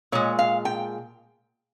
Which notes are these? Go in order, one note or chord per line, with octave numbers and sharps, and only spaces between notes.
A#2 G#3 C#5
F5
G5